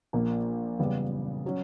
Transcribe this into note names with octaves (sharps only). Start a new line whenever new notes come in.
A#1 A#2 A#3
F#1 E2 C#3 G3 B3
F#3 C#4